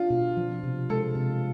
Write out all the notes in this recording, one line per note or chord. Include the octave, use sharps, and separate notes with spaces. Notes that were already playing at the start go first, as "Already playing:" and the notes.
Already playing: D4 F4
B2
F3
C3
G#3 A4
C3